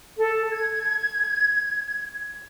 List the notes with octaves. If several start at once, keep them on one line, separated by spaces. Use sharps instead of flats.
A4
G#6